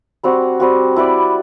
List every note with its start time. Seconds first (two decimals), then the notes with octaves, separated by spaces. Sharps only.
0.23 G3 C4 F#4
0.60 G3 C4 F#4
0.96 E4 B4 D5